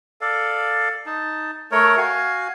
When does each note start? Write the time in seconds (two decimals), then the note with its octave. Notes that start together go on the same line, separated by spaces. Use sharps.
0.21 A4 D5 F5
1.06 D#4 A5
1.71 A3 A#4 C#5
1.97 F#4 F5 G#5